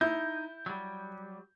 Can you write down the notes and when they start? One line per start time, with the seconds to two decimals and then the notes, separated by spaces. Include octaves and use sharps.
0.01 D#4 E4 G6
0.66 F#3 G3